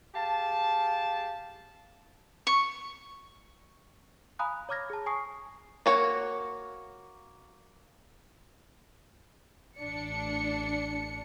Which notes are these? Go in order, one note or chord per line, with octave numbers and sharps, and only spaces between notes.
G4 G#4 F5 A5
C#6
F5 G#5 A#5 B5 D#6 F#6
C#5 A#5 D6 F6 G#6 A#6
G#4 A5
G#5 C#6 D#6 C7
A#3 F#4 C#5
A1 D4 C#7